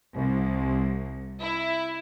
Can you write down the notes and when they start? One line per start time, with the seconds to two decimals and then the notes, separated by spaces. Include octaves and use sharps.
0.15 C2
1.40 E4